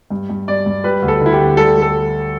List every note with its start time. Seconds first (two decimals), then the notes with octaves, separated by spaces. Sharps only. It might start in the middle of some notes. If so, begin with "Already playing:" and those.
0.10 G2
0.30 G2
0.48 G2 D5
0.66 G2
0.84 G3 B4
1.02 D2
1.08 A4
1.21 D3 E4
1.33 G4
1.39 D2
1.57 G3 A4
1.76 G3
1.82 A4